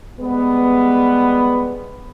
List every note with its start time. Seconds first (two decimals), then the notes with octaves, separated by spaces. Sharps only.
0.20 G3 G#3 B3